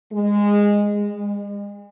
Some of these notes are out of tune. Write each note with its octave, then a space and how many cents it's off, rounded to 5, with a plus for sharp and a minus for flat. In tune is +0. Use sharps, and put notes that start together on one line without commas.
G#3 -15
G#3 -40